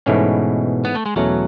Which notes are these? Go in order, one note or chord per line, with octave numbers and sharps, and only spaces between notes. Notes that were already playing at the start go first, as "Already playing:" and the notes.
G#2 B2 E3 A3 C#4
B3
A3
G#3
E2 B2 F#3 A3 C#4